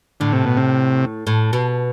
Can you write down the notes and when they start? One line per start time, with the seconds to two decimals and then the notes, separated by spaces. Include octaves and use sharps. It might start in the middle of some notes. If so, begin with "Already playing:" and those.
0.20 A2 D3
0.32 C3
0.46 B2
0.57 C3
1.27 A2
1.53 B2